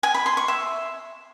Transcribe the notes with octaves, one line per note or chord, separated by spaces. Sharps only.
G#5
B5
C6
C#6
E5